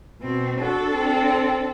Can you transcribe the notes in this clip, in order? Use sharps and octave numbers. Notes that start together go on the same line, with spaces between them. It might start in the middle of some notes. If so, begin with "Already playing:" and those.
B2 C4
D4 F#4 A4
C4